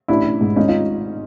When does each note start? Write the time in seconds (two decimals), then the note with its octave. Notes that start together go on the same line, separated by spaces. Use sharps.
0.08 A1 D4 E4
0.24 A1
0.41 G#2
0.56 G#1 C#4 D#4
0.69 D#4 F4